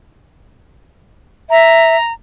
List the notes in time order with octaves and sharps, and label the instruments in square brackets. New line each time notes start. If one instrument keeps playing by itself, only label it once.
[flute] E5 [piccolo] A#5